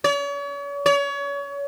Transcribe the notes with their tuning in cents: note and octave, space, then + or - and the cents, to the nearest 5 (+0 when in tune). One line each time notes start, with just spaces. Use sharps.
C#5 +40
C#5 +30